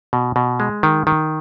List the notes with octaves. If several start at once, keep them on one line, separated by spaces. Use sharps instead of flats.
B2
B2
G#3
D#3
D#3